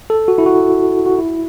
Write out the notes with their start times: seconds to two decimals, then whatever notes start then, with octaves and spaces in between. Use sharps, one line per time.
0.10 A4
0.28 F#4
0.38 E4
0.46 F#4
1.06 F#4
1.18 E4